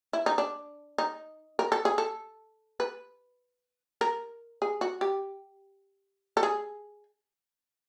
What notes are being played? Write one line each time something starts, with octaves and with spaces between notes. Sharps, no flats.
E4
D#4
D4
D#4
A#4
A4
G#4
A4
B4
A#4
G#4
F#4
G4
A4
G#4